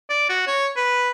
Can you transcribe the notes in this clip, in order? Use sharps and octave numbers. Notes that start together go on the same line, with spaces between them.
D5
F#4
C#5
B4